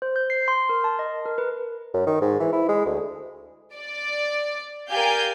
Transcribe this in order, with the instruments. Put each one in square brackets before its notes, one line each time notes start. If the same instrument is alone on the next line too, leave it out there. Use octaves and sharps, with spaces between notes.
[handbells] C5
G6
C7
C6
A#4
A5
D#5
A#4
B4
[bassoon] F#2
D#3
G#2
E3
E4
G#3
D2
[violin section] D5
G4 A#4 D5 F5 G#5 G6